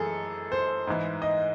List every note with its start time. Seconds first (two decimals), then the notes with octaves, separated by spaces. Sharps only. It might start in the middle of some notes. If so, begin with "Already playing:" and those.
Already playing: F#2 E3 G#4 A4
0.52 C5
0.87 G#2 E3
1.22 D#5